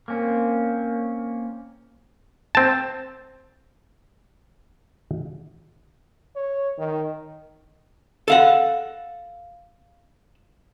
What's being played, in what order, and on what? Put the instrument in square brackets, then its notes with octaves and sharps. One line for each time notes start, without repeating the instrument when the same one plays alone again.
[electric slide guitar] A#3 C4 C#4
[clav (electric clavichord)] C4 A5
[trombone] C#5
D#3
[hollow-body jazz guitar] A4 F5 F#5